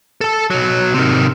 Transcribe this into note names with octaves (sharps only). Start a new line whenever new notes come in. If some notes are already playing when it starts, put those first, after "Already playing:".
A4 A5
B1 F#3
C3 D#3